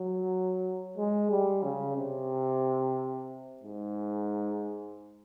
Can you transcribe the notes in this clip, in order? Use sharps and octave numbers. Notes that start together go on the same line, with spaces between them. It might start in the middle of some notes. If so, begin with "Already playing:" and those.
Already playing: F#3
G#3
G3
C#3
C3
G#2